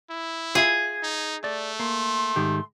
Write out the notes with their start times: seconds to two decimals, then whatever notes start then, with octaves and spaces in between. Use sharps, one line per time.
0.10 E4
0.55 F4 G#4 E5
1.03 D#4
1.44 A3 D5
1.80 A#3 C6
2.36 G#2 D#3 G4